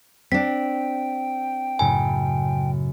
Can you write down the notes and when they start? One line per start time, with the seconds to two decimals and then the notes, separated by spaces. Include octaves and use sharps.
0.32 C4 D4 G5 B6
1.79 F#2 A2 C#3 G#5